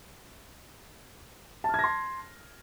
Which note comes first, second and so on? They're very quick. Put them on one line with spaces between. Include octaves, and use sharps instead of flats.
A5 F6 G#6 A#6 C6